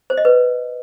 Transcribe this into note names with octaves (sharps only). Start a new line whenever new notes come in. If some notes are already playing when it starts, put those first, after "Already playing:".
C5
D#5
B4